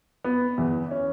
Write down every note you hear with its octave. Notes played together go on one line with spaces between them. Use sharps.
B3
E2 E3
C#4